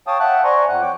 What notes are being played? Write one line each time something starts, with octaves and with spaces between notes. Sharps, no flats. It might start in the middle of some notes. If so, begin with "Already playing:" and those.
C#5 F5 G5 A5 D#6
E5 F#5 G5 A5 F#6
C5 D5 G#5 A#5 C6 C#6
F2 C4 F#5 F#6
C#5 G5 D6